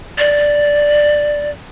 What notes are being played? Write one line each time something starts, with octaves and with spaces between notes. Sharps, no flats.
D5